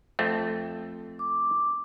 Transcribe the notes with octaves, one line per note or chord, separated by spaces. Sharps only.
F2 A3 C4
D6